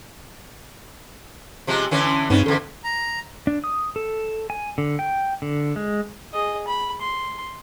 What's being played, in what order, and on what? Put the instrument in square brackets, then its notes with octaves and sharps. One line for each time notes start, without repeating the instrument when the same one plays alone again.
[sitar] C3 F3 G#3
D3 E3 C#4
[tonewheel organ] G2 C4 D#4 [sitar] C#3 B3
[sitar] E2 D3 [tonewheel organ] A4
[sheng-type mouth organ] A#5
[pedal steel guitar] D4
D#6
A4
G#5
D3
G5
D3
G#3
[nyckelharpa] G#4 D#5
B5
C6